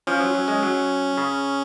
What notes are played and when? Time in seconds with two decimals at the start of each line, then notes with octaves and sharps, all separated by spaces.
0.07 F3 C#4
0.21 F#3
0.35 F#3
0.48 G#3
0.63 F#3
1.18 C#3